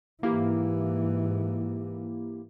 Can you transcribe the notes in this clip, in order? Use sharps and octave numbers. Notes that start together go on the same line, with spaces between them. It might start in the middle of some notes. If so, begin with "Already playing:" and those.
G#2 E3 A#3 E4 G4